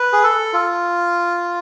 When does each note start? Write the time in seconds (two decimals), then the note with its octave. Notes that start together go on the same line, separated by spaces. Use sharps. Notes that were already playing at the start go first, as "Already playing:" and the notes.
Already playing: B4
0.13 G#4
0.23 A4
0.53 F4